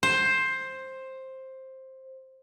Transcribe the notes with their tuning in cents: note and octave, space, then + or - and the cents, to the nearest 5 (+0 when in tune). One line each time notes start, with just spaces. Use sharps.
C5 +10